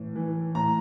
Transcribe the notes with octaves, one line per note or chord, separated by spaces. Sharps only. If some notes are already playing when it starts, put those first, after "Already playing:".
Already playing: A2 E3
E3
A2 A#5